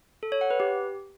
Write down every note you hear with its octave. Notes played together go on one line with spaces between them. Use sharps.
A4
C#5
F#5
B4
G4